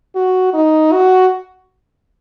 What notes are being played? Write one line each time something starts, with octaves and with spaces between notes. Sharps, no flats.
F#4
D#4
F#4